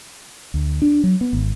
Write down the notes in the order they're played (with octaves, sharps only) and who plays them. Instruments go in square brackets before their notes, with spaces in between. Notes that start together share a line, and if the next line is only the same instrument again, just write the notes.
[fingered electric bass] D2
D4
F#3
B3
G#1